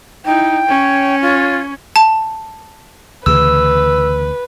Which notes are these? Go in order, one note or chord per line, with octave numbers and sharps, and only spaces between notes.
D#4 E4 G5
C#4 C#5
F4
A5
D2 C#3 E3 B4 E6